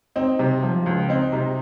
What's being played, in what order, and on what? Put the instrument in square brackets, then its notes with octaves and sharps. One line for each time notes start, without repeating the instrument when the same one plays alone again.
[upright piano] C4 D#4
C3
F3
C#2
C4 D#4
C3